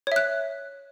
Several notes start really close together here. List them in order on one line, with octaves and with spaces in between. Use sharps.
C#5 E5 F#6